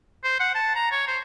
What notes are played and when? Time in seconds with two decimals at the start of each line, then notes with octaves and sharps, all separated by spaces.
0.24 C5
0.40 F#5
0.55 A5
0.75 A#5
0.92 C#5
1.08 C5